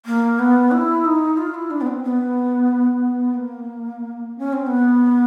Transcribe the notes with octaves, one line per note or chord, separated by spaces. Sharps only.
A#3
B3
E4
D#4
F4
E4
D4
B3
C4
B3
A#3
C#4
C4
B3